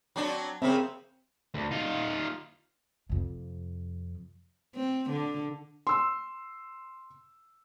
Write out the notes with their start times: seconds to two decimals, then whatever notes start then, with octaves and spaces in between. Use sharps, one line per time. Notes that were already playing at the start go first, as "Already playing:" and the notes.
0.16 F#3 C4 D4
0.62 C#3 A#3 C4 E5
1.54 D2
1.71 D#4 F4
3.09 F2 C3
4.76 C4
5.10 D3
5.87 C6 E6